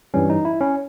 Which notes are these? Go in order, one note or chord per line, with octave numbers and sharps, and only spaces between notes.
G2 E3 G3 C#4
D#4
E4
C#4